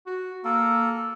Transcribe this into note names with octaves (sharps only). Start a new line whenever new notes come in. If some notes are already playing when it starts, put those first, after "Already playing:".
F#4
A#3 A4